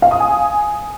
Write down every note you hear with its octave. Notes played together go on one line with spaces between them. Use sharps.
F5
D#6
G#5